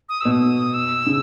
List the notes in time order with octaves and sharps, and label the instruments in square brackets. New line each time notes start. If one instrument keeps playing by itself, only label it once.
[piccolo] D#6
[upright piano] B2 [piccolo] E6
[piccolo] D#6
E6
[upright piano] C#3